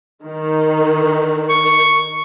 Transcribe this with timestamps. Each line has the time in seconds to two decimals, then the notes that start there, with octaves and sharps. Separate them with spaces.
0.24 D#3
1.50 C#6